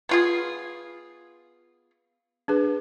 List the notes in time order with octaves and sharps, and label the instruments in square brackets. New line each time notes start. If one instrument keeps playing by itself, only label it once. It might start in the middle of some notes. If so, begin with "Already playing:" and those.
[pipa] B3 F4 G#4
[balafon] D4 G#4 B4